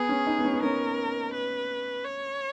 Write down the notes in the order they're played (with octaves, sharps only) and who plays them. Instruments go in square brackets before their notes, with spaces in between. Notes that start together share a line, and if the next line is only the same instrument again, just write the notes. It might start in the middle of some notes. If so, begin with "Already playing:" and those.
Already playing: [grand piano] B3 [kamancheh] G#4
[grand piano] C#4
D#4
B3
C#4
B3
[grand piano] C#4 [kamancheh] A#4
[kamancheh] B4
C#5